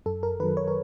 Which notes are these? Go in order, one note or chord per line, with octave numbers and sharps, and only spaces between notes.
F#2 A4
A#4
D#3 F#3 B4
C#5
A#4